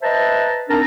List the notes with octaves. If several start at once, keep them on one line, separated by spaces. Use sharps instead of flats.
B4 C5 D#5 E5 A5 A#5
C4 D4 D#4 A#4 A5 A#5